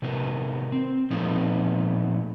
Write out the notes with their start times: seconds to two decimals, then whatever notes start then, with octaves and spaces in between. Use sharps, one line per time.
0.02 C3 D#3 B3 A#4
0.72 C4
1.10 A#2 F3 A3 B3 C4 D#4